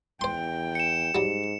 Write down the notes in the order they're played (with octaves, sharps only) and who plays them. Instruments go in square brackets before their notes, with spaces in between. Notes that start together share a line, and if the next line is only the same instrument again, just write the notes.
[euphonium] E2 [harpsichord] C5 C6 [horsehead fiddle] G5
[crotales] C#7 E7
[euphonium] G#2 [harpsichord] F#3 G3